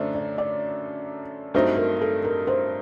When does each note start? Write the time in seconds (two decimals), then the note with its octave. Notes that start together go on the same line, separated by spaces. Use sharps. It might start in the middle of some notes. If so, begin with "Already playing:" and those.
Already playing: F#2 D3 A3 D4 C5 D5
0.15 D5
0.38 D5
1.54 G2 F#3 A3 C4 D#4 C5
1.77 A#4
2.01 A4
2.24 A#4
2.47 C5